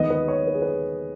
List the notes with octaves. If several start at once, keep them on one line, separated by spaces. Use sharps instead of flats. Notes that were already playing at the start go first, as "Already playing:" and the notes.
Already playing: D#2 D#3 G#3 B3 D#5
B4
C#5
B4
G#4
B4